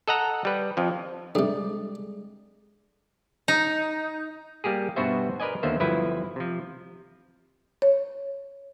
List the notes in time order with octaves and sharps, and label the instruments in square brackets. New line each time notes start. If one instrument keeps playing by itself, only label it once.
[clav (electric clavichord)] A4 D#5 F#5 A#5
G3 B4
F2 F3
[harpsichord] G2 C3 [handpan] G3 G#3 D5 [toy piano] A4
[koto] D#4
[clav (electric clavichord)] G3 A#3 G4 G#4
G2 B2 B3 F#4 C5 E5
A#4 B4 D5 D#5 G#5
D#2 D3 A#3 B3 C5 E5
G1 F3 F#3 E4 B4
C3 F3
[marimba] C#5